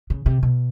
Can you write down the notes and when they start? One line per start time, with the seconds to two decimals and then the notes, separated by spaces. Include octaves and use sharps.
0.10 C#3
0.26 C3
0.43 B2